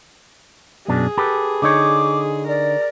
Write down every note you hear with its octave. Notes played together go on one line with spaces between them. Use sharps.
F#2 B2 D4 G#4
G4 A4 B4
D3 D#4 C#5 D6
A#4 D5